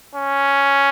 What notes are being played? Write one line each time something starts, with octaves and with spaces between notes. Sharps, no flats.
C#4